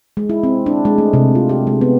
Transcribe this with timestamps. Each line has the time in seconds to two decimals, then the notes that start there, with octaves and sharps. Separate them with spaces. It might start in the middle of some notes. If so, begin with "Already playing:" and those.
0.17 G#3
0.30 E4
0.43 C4
0.66 D4
0.85 G#3
0.98 A3
1.13 C3
1.35 F4
1.49 G4
1.67 G#3
1.81 B3